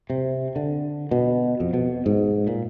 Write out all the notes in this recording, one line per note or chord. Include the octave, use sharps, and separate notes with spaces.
C3
D3
B2
F2
B2
G#2
A#2